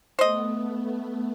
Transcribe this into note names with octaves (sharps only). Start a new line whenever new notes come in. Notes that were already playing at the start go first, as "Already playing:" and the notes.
A3 B3 C5 D#5